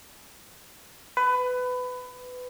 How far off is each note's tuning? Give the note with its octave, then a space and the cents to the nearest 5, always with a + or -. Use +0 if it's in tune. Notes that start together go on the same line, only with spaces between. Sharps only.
B4 +20